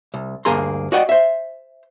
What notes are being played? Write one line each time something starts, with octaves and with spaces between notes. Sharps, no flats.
C2
D2 G2 A#3 G#4 A#5 C6
F#4 D5 D#5 F#5 G5
C5 E5